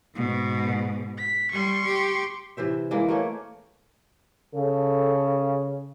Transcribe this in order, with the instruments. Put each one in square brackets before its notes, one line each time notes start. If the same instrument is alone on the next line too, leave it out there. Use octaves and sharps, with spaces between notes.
[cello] G#2 B2
[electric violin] B6
[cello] G3 [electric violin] C6 C#6
[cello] G4
[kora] C3 E3 C5 E5
E3 G#3 A#3
A3 A#3 C#5
[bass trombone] C#3 [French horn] A4